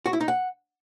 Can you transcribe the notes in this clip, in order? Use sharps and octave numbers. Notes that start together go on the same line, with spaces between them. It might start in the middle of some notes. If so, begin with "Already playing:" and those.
F#4
E4
D#4
F#5